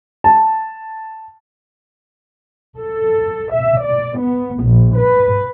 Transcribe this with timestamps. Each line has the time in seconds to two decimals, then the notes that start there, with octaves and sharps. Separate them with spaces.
0.24 A5
2.78 A4
3.51 E5
3.84 D5
4.19 B3
4.62 A#1
4.98 B4